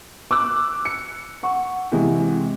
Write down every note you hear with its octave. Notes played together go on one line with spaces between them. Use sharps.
D6 E6 F#6
C#7
F#5 C#6
C3 E3 G#3